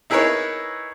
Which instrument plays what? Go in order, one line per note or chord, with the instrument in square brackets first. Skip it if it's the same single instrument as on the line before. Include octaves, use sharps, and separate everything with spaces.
[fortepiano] D#4 E4 G#4 A#4 B4 C#5